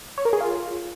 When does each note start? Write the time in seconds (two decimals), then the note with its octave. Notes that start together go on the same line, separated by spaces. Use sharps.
0.18 C#5
0.25 A#4
0.33 G#4
0.41 F4